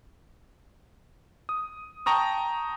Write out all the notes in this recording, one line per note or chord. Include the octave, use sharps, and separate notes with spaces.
D#6
G5 A5 A#5 C#6 D#6